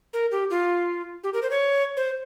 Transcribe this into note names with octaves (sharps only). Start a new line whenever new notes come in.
A#4
G4
F4
G4
A#4
C5
C#5
C5